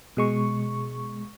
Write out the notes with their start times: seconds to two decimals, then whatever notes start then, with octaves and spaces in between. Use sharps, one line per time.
0.17 B2 G#3 C#6